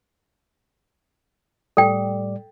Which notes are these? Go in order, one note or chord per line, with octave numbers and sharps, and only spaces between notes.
A2 G3 A4 D5 G5